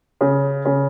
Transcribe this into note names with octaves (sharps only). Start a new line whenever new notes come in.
C#3
C#3